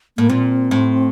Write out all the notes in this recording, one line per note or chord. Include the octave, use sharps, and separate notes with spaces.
A2 A#3
A#2 C4
A2